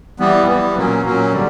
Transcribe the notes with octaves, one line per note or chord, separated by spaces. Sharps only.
E3 G3 B3
E3 G3 B3
A#2 F#3 A#3 C#4
A#2 F#3 A#3 C#4
D3 G3